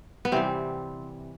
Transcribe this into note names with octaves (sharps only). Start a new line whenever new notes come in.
B3
C3 E3 G3 C4